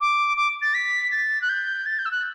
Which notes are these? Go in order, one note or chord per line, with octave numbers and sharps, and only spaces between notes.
D6
D6
A6
B6
A6
F#6
G6
A6
G6
E6
F#6